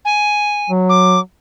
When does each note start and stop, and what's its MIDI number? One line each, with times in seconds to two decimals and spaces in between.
0.05 0.71 80
0.70 1.19 54
0.89 1.20 86